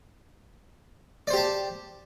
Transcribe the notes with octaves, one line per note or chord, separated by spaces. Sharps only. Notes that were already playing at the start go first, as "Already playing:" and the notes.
G4 C5 D5 A5